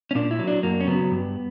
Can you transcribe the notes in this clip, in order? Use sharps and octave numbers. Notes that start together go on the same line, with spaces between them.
C#4
A#2 D4
E4
F#3
D4
F#2 A#3
C#4
C#3 F#3 B3
G2